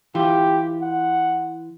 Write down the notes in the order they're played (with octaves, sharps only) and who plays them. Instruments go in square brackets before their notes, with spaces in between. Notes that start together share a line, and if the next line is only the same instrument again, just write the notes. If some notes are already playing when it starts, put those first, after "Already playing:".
[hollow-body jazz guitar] E3 F4 [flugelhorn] G4
[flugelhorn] F#5